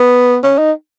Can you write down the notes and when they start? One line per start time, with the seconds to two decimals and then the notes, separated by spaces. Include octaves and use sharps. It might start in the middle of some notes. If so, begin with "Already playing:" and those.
Already playing: B3
0.43 C#4
0.58 D#4